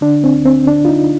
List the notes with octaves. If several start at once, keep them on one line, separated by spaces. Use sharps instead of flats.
D3 D4
C4
D2
C4
D3 D4
F4
D#4